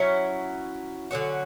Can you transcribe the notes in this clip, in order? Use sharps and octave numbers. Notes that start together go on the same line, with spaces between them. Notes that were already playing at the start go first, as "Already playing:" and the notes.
Already playing: F#3 C#4 E4
D3 F#3 C#4 F#4